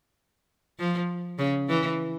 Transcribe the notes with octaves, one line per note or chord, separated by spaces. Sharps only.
F3
C#3
E3